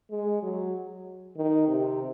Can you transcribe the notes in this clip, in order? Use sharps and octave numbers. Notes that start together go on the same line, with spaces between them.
G#3
F#3
D#3
C3